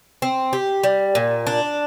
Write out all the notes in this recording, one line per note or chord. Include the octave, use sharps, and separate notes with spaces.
C4
G4
G3
A#2
D4